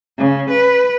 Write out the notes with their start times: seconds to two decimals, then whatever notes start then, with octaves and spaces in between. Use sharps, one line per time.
0.18 C#3
0.50 B4